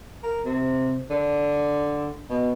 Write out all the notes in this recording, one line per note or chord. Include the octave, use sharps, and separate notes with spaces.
A#4
C3
D3
B2